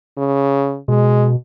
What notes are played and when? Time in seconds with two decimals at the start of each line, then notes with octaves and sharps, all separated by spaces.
0.17 C#3
0.88 B2 G#3